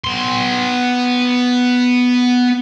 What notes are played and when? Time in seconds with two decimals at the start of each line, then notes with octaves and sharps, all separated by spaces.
0.04 B3 C6